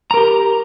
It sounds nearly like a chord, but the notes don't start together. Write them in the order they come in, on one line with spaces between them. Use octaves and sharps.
A#5 A#4 G4